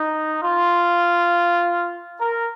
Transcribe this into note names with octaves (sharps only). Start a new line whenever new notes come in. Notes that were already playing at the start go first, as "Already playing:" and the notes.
Already playing: D#4
F4
A#4